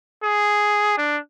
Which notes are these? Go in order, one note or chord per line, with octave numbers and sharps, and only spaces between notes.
G#4
D4